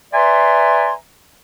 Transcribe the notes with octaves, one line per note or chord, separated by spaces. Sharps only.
B4 D5 E5 G#5 A#5 C6